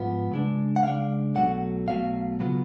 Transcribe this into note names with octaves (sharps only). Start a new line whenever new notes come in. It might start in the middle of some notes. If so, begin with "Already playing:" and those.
Already playing: G#2 F3 B3 F4
C#3 G#3 D4
F#5
C#3 G#3 D4 F5
B1 B2 F#3 A3 F#5
B1 B2 F#3 A3 F5
C#3 F#3 B3 F4